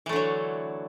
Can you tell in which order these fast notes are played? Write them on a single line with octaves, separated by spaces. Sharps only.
E3 A3 D3 F#3